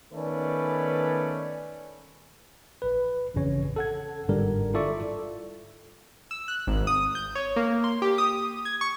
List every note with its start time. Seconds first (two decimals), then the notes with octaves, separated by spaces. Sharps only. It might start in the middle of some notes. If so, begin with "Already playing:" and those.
0.13 D#3 A3 B3 C#4 B4 D5
2.82 A#1 B4
3.35 A1 F2 C#3 C#4 C#5
3.76 A4 F#5 G#6
4.28 G1 G#2 D3 G3 A#4
4.74 E4 F4 A4 D5 E5 C#6
6.31 E6
6.48 F#6
6.67 G#1
6.87 D#6
7.15 G6
7.35 C#5
7.56 A#3
7.84 C6
8.02 G4
8.18 D#6
8.65 G#6
8.81 C#6